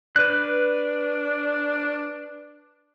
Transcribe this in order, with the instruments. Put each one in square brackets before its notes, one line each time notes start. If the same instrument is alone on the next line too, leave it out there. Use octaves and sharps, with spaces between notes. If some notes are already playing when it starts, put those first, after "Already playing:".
[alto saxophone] D4 [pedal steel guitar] B4 F#6